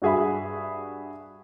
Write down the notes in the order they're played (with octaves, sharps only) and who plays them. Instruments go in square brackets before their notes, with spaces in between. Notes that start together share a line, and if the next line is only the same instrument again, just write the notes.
[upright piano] G2 F#4 G#4 E5 B5